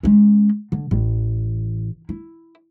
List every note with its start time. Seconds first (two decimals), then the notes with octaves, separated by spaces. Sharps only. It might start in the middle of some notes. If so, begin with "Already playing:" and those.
0.03 G#3 C#4
0.72 D3
0.91 A1
2.09 E4